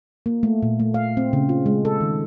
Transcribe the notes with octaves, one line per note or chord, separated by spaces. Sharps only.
A#3
A3
A#2
A3
F5
C4
C#3
F4
G#3
A4
D#3